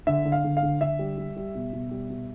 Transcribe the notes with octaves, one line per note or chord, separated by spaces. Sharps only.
D3 E5
D3
F5
D3
F5
D3
D3 E5
G3
G3
G3
B2
B2
G3
B2